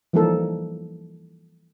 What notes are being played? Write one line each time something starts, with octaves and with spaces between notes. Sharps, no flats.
E3 F3 G3 A#3 D#4 A4